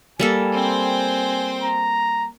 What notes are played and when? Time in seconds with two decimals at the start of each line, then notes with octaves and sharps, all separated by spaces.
0.19 G3 A#3 A4 G#5
0.54 C4 C5
1.62 A#5